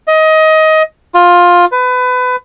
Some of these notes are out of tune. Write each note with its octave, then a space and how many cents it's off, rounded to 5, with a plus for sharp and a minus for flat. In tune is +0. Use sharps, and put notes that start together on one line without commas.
D#5 +20
F4 +15
B4 +25